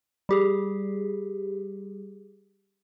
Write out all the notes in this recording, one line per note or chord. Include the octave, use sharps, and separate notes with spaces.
G3 G4 G#4